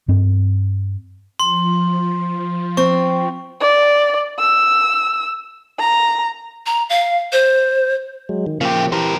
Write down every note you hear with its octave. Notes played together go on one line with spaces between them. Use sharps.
G2 C4
F3 C6
C4 C#6
D5
E6
A#5
A#5
F5
C5
F#3 G#3
D#3
C#3 F3 A#3 G4
E3 C4 G4 A#4